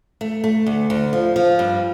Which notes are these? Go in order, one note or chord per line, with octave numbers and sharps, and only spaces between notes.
A3
A3
D2
D2
F3
F3
G2